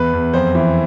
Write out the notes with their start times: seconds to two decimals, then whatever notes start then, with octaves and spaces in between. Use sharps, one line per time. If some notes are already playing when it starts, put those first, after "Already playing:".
Already playing: E2 B4
0.13 E2
0.34 F2 C5
0.55 E3